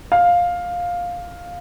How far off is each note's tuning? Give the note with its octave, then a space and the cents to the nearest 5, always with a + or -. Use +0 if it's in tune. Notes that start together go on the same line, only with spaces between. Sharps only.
F5 +10